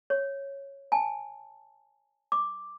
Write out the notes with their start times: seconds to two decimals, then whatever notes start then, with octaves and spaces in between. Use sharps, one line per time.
0.10 C#5
0.92 G#5 A5
2.32 D6